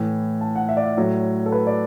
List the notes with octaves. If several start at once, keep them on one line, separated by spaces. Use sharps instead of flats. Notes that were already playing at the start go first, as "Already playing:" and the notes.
Already playing: A2 E3
A5
F#5
E5
D5
E5
A2 F#3
A4
B4
D5